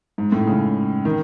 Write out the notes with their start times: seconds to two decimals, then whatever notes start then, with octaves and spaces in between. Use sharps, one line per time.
0.18 G#2
0.32 A2
0.47 C#3
1.05 D#3